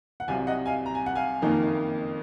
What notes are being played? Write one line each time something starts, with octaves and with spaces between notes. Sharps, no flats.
F#5
C2 C3 F#3 C4 F5 G#5
D#5 F#5
F5 G#5
A#5
G#5
F#5
F5 G#5
F#1 F2 D#3 A#3 D#4